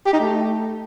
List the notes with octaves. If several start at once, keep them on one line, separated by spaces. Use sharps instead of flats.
G4
D#4
A3